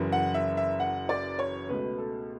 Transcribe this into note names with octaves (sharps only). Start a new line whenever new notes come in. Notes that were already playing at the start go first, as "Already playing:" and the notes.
Already playing: F#1 F#2 E3
F#5
E5
E5
F#5
D5
C#5
C#2 B2 A3 B4
A4